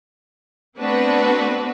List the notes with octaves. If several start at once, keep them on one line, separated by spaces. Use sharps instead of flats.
A3 B3 C4 D4 F#4 B4